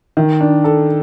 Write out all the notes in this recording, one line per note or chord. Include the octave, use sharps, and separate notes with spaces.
D#3
D4
A4